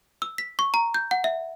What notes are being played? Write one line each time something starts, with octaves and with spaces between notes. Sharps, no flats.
E6
B6
C#6
A#5
G6
F#5
E5